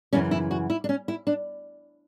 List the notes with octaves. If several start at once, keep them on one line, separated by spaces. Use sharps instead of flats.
F#2 C#3 E3 C#4
E4
F#4
E4
D4
C#4
E4
D4